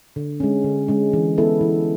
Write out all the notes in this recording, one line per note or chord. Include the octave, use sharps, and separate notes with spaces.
D3
G#3 C#4
D3
G#3 C#4
E3
B3 E4 A4
E3